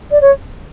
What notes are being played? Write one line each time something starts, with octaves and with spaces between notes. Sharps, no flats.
D5
C#5